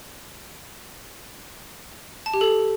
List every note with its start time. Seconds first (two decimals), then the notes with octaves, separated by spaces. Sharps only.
2.26 A5
2.34 G4
2.41 A4